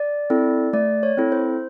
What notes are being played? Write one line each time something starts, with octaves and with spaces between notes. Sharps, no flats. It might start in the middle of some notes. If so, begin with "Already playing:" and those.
Already playing: D5
C4 E4 A4
A3 D5
C#5
C4 E4 A4
C5